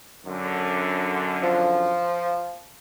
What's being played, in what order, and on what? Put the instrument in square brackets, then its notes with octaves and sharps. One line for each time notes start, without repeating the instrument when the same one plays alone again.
[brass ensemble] F#2 D3
[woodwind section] F3